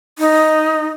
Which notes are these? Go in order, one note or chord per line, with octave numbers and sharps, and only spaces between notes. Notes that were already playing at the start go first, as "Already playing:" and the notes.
D#4